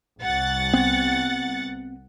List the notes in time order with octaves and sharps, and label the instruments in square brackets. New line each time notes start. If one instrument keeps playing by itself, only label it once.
[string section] C2 F#5 A6
[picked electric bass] B3 C4